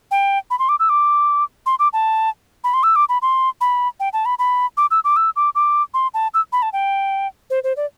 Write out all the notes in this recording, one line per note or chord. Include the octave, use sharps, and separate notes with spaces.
G5
B5
C6
D6
E6
D6
C6
D6
A5
B5
C6
E6
D6
B5
C6
B5
G5
A5
B5
B5
D6
E6
D6
E6
D6
D6
C6
A5
E6
B5
A5
G5
C5
C5
D5